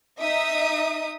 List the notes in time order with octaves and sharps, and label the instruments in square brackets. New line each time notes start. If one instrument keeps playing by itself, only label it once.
[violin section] D#4 E5 D#6